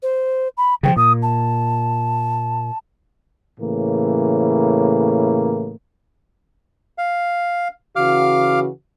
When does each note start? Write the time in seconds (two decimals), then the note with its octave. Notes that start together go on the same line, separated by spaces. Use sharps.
0.02 C5
0.57 B5
0.83 C#3 E3 F3 G5
0.96 A#2 D#6
1.22 A5
3.59 A2 C#3 E3 A#3
6.98 F5
7.96 C#3 E3 F#4 F5 D6 F6